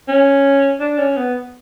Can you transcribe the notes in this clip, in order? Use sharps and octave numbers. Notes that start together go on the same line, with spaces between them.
C#4
D4
C#4
B3